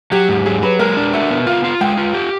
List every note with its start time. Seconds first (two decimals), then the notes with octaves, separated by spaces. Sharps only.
0.12 F#3 G4
0.29 G#2
0.46 F#3 G#4
0.62 F#3 B4
0.79 G#3 A#4
0.97 D4
1.13 F#4 E5
1.31 B3
1.46 F4 F5
1.64 F4
1.81 G#3 G5
1.97 F4
2.14 G4